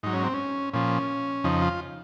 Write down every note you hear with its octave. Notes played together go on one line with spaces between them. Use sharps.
G#2 F#3 D#4
C#4
C4
C#4
A#2 F3 C#4
F2 C#3 F3 D#4
F4